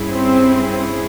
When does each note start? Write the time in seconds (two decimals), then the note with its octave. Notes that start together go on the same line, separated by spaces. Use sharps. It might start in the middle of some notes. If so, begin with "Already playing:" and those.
Already playing: G2 G3 C#4 E4 G#4
0.12 C4